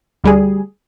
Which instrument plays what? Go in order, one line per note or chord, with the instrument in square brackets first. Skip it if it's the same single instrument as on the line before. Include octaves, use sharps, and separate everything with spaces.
[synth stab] D2 G3 G#4